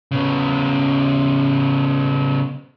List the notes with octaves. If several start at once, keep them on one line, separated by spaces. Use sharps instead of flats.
C#3 B3